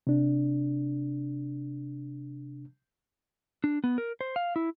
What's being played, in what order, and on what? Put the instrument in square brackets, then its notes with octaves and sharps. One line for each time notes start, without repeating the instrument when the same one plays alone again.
[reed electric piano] C3 D4
[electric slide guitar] D4
B3
A#4
C5
F5
E4